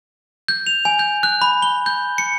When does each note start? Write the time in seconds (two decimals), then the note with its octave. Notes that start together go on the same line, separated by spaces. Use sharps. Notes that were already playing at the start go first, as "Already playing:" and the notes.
0.48 G6
0.67 F7
0.85 G#5
0.99 G6
1.23 F#6
1.42 B5
1.62 G7
1.86 G6
2.18 C#7